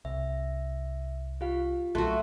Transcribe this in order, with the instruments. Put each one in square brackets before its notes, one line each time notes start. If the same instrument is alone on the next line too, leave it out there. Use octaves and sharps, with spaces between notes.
[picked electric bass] C2 [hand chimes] E5
[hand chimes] F4 G4 F5
[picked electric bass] B1 A#2 F#3 [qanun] A3 F#4 [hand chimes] A4 C6 F#6